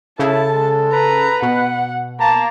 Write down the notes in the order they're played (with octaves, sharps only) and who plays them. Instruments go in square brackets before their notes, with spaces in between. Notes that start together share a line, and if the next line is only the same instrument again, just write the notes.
[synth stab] C#3 [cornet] E4 [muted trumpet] A4 [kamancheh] A5
[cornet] G#3
[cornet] B4 [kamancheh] A#5
[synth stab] B2 [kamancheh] F#5
[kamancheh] A#3 F5 [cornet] A5 [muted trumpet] A#5